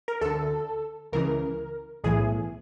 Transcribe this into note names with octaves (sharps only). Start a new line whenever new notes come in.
A#4
D2 D3 A4
C#2 C#3 E3 A#4
B1 A2 E3 G#4